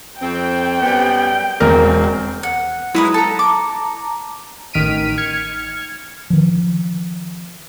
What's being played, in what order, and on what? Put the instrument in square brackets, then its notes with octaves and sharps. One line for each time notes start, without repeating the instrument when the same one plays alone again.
[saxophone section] F2 C4 [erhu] G5
[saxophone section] F#2 G3 B3
[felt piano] E1 A#4 [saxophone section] C#3 C4
[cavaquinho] F#5
[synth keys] F#3 G#3 E4 [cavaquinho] D#4 B4 D#6
[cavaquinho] A4 [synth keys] A5 A#5
[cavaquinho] D6
[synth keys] A1 D#3 F6 B6 D7 D#7
F6 G#6 C#7
[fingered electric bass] D#3 F3